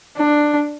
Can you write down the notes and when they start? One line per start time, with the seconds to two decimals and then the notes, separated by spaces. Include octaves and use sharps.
0.17 D4